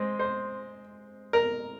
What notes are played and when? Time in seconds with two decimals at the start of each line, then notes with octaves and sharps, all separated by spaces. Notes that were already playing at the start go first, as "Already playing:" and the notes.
Already playing: G#3 C4 D#5
0.19 C5
1.33 A#4